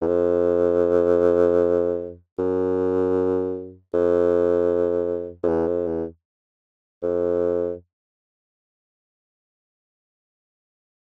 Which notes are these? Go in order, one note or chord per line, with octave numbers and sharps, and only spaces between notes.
E2
F2
F#2
F2
F2
E2
F2
E2
F2